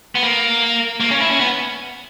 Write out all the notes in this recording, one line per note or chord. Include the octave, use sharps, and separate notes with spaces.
B3
A#3
A#3
C#4
E4
C#4
B3